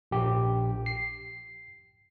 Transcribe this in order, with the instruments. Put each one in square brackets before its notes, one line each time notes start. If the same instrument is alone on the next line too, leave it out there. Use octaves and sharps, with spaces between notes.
[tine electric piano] A#1 G4
C7